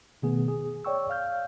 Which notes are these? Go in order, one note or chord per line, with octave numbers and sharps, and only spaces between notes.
B2 D#3 A3 B3 G#4
G#4
C#5 D5 G5 C#6 E6
F5 F6 G6